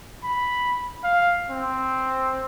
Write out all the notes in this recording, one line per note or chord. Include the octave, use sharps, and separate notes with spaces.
B5
F5
C4